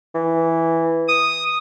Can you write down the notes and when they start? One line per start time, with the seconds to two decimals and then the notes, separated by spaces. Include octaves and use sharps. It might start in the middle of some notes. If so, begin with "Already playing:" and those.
0.15 E3
1.08 D#6